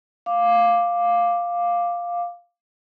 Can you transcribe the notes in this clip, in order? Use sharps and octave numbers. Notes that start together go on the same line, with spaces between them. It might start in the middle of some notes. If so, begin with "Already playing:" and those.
F5 D6